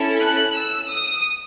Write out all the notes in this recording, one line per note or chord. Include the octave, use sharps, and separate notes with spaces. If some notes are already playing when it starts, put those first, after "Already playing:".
Already playing: C#4 E4 A4
F#6
E6
D#6